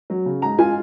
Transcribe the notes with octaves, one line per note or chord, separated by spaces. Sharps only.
F#3
C#3
G#2 A#5
F4 G#5